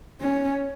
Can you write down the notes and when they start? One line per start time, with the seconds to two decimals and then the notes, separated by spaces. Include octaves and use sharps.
0.21 C#4